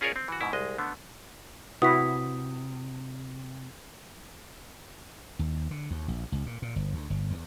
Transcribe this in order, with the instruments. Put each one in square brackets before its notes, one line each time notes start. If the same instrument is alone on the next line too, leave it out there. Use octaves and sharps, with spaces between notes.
[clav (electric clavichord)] C#4 F4 G#4 A#4 C#5 D5
C4
E3 F#4
G#2 B2 E4
C2 G#3 D#5
D3 A3 B3
[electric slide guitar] C3 [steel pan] E4 F#4 B4 [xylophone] D#6 B6
[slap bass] D#2
D3
D#2
A#1
C#2
A#2
A#2
G1
D2
G1
E2